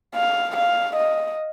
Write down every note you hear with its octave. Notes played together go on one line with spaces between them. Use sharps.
F5
F5
D#5